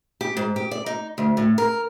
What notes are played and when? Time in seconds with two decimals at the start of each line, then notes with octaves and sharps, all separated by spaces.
0.21 G4
0.37 G#2
0.56 G4
0.71 D5
0.86 D#4
1.18 D2
1.37 A2
1.58 A#4